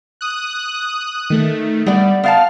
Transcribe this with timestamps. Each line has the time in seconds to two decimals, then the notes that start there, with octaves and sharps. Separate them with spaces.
0.21 D#6 F#6
1.30 D#3 A3
1.86 G3 B3 D5
2.23 B3 F5 A5 F6